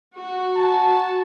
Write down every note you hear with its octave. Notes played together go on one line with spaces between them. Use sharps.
F#4
A5